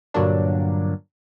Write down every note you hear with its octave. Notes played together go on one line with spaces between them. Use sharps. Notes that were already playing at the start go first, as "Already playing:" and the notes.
G2 A#2 D3 F#3 A#3 D4